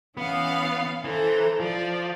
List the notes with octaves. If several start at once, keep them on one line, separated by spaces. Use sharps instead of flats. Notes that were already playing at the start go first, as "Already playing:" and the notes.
E3 B3 C#4 F5
E3 A4 C5 A#5
F3 D5